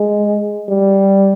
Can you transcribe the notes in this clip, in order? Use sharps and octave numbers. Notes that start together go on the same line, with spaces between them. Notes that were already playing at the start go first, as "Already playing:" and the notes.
Already playing: G#3
G3